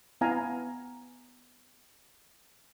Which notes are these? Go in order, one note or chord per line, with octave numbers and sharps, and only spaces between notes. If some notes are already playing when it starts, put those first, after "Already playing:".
B3 E4 F5 G#5 A#5